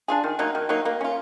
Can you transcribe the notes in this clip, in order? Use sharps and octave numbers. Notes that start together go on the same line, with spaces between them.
D4 F4 G#4
D#3
F#3 A#3 D#4
D#3
F#3 A#3 D#4
A#3
C#4 F4